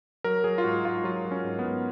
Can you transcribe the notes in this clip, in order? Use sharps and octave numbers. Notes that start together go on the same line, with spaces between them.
F#3 A#4
F#3 G#4
F4
G#2 F#4
G#2 F4
F#3 F4
F#3
C#4
G#2
B3
G#2